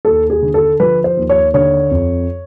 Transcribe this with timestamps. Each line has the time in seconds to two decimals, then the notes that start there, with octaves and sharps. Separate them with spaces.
0.05 D#2 A4
0.30 G#4
0.42 D3
0.54 A4
0.80 F3 B4
1.04 C5
1.17 D#2
1.29 C#5
1.54 D3 C#5
1.91 F2